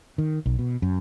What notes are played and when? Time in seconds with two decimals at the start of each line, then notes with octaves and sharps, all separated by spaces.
0.18 D#3
0.46 B1
0.59 B2
0.82 F#2